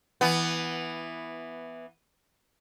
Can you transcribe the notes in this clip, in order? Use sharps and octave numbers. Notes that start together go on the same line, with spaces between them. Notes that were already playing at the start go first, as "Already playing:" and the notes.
E3 B3